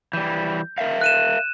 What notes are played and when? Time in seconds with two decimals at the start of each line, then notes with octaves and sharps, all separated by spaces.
0.13 E3 G3 G6
0.78 A#4 E5 F5
1.01 F#6 D#7 E7